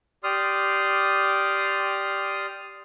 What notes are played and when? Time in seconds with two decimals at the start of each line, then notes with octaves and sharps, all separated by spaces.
0.24 G4 D5 C6 D#6 F6